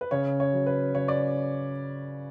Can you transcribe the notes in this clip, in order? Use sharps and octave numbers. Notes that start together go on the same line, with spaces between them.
B4
C#3 C#5
C#5
F#3
B4
C#3 C#5
D5